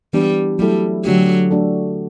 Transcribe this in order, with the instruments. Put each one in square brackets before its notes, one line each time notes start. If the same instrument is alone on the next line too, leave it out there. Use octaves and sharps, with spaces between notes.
[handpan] E3 B3 D4 [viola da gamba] G3
[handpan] F#3 A3 E4 A4 [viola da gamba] G3
[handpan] D3 A3 D4 G4 [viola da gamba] F#3
[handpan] A3 D4 F#4 A4